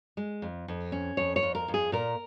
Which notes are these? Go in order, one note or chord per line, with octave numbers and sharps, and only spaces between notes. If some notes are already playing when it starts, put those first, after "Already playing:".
G#3
F2
F2
C#4
F2 C#5
C#5
F2
A#4
F2
G#4
A#2 A#4